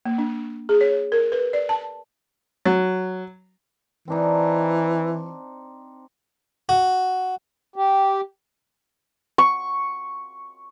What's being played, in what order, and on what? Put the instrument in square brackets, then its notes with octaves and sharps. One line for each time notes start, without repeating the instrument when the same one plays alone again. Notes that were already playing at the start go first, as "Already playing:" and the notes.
[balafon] A#3
D4
G#4
C#5
A#4
B4
D5
A5
[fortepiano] F#3
[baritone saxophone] E3 [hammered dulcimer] C4 D4 D#4
[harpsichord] F#4
[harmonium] G4
[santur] C#6